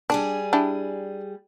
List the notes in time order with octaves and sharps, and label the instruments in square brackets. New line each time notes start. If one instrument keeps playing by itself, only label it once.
[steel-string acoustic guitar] G3 G#4 G#5 [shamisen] D4
[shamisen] D4 E4 G4